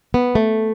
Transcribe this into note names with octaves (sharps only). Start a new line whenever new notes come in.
B3
A3